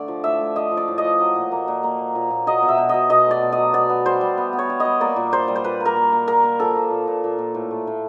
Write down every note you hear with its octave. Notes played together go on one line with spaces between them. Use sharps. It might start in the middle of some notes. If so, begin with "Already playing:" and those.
Already playing: D3 A3 D5
F3
A2 E5
A2
F3 D#5
F3
D5
A2
D#5
F3
F#3
A#2
A#3
A#2
A#3
A#3
A#2
A#2
F#3 D#5
B2
E5
B2
B2 D#5
B2 D#5
A3 D5
B2
D#5
F#3
B3 D5
B3
G3 C5
G3
B3
B3
C#5
G3
G3 D#5
A#3 D5
A#2
A#3 C5
G3
C5
A#2 B4
A#3 A#4
A#3
A#3
A#3 A#4
A#3
F3 A4
A#3
A#2
A#2
A#2
A#2
A2
A3
A2